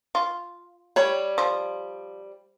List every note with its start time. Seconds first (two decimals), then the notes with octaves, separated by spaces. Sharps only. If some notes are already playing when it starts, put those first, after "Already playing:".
0.15 F4
0.96 G3 C#5
1.38 F3